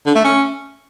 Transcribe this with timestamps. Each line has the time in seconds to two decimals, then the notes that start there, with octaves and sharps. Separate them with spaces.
0.06 D3
0.15 A3
0.24 C#4